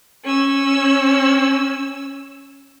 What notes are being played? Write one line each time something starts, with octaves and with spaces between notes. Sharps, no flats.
C#4 E6